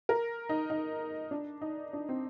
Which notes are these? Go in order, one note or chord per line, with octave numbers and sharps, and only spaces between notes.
A#4
D#4
D#4
D4
D#4
D4
C4